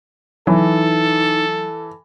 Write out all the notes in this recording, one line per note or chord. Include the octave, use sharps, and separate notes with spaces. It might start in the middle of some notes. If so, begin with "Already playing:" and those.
E3 F#3 D#4 A4